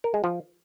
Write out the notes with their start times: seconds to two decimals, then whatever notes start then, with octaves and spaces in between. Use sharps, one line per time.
0.04 A#4
0.14 G#3
0.24 F3